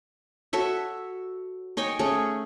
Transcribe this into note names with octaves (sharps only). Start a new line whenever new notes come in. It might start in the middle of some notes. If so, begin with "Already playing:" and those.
F#4 A4 C#5 E5
D#4 C#5 G5 G#5
A3 C#4 G#4